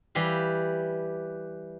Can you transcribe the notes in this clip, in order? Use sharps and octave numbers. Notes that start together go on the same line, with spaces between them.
E3 G3 G4 F5